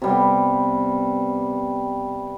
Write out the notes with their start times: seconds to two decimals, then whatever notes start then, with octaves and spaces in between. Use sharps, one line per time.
0.02 C3 G3 B3